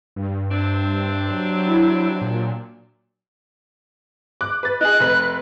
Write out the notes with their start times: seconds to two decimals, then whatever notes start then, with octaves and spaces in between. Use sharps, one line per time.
0.16 G2
0.50 C3 C4 D4
1.31 F#3
1.68 E4
2.21 A#2
4.41 D6 F#6
4.63 B4 A6
4.81 D#4 G#4 F#6
5.00 F1 B4